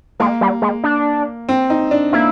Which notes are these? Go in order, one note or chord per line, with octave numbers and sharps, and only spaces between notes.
G#3 A#3
G3
G#3
D4
C4
D#4
D4
A#3 E4